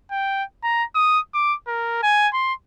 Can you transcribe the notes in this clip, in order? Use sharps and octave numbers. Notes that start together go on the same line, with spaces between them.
G5
A#5
D#6
D6
A#4
G#5
C6